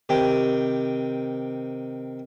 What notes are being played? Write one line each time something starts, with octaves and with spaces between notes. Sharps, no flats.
C3 D#3 C4 G4